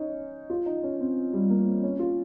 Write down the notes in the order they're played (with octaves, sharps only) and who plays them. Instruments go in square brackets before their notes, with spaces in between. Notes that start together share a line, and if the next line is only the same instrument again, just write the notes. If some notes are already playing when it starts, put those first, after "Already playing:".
Already playing: [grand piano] C#4 D#4
F4
D#4
C#4
C4
G3
A#3
C4
C#4
F4